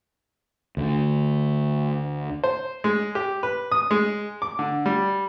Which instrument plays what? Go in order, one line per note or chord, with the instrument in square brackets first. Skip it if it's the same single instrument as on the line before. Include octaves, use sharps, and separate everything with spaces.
[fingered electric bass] D2 D3
[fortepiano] C5
G#3
G4
B4
D#6
G#3
D6
D3
G3